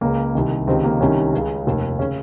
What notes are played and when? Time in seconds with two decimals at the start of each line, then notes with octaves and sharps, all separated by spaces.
0.01 C#2 C#3 A#3
0.35 C2 C3 D#3
0.67 C#2 C3 D#3 C4
0.84 A#3
1.00 C2 C3 D#3 C#4
1.33 C#2 C#3
1.67 F1 D#2 D#3
1.99 C#3 C#4